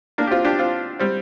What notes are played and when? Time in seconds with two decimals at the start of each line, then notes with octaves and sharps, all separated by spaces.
0.18 A#3 D4
0.27 G4
0.31 C4 F4
0.44 D4 G4
0.59 C4 F4
0.99 G3 C4